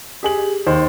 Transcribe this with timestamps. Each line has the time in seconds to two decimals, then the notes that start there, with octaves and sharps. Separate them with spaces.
0.23 G4 G#4 F#7
0.66 D#2 C5